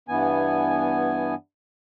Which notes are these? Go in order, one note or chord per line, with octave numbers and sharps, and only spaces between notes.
G2 E3 B3 G#5